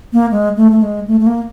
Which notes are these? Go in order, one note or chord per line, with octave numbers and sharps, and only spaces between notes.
A#3
G#3
A3
A3
G#3
A3
A3
A#3